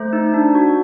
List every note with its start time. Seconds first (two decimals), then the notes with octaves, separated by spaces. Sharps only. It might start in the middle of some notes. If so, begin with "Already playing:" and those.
Already playing: A3 C5
0.13 D#4
0.34 D4
0.55 F#4